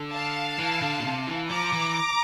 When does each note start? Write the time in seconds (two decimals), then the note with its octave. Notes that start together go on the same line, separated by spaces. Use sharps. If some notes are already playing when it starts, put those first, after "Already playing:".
Already playing: D3
0.14 F5 A5
0.59 E3
0.82 D3
1.00 A#2
1.04 C3
1.27 E3
1.50 F3 A#5 D6
1.73 E3